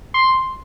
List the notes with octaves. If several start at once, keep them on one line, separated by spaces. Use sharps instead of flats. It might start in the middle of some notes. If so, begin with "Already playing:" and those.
C6